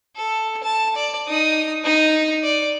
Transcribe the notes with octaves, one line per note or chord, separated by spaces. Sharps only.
A4
A5
D5
D#4 D#6
D#4
D5